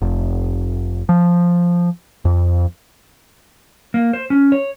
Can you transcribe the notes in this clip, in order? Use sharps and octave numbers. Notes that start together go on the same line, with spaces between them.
F1
F3
F2
A#3
C5
C#4
C#5